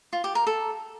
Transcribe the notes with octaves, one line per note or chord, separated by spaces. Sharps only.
F4
G4
A#4
A4